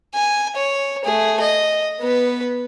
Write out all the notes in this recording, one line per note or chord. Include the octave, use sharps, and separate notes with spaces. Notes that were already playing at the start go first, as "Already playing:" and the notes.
G#5
C#5
A3 G#4
D#5
B3 B4